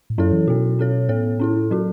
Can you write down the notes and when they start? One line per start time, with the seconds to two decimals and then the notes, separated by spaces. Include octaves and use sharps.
0.10 A2
0.18 F#2 F#3 C#4 E4 A4 C#5
0.32 E3
0.48 B2 F#3 B3 F#4
0.79 C#4 A4 C#5
1.09 A2 B3 A4 C#5
1.39 C#4 E4 A4
1.71 F#3 C#4 F#4